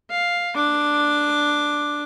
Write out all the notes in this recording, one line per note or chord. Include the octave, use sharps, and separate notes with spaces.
F5
D4 D6